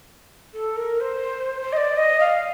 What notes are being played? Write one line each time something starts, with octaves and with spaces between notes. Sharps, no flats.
A4
A#4
C5
C5
D#5
D5
D#5
F5